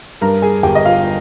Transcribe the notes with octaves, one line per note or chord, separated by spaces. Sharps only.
G2 A#4 A#5
G#4 G#5
G1 G4 G5
D#5
F4 F5